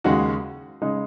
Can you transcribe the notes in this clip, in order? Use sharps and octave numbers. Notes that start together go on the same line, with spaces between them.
D#2 C#3 G#3 D#4 F#4
C#3 G#3 D#4